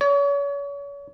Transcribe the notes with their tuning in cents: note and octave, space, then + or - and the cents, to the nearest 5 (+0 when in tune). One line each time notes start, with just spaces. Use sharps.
C#5 +35